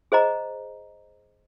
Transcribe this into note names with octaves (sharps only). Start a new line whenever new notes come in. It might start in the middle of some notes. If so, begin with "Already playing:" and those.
G#4 C5 D#5 A#5